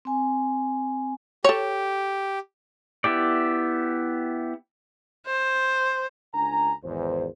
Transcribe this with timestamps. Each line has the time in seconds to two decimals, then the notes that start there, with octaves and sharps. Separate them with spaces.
0.05 C4 G#5
1.44 G4 A4 C#5
3.04 B3 E4 G4 D5
5.26 C5
6.34 C#2 D4 G#5 A#5
6.84 G#1 E2 C5